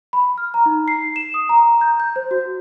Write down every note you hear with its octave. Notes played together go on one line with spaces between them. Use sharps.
B5
F6
A#5
D#4
C7
E7
D#6
A#5
G6
G6
C5
F#4